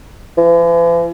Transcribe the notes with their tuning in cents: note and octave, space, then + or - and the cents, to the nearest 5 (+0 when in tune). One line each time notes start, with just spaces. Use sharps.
E3 +45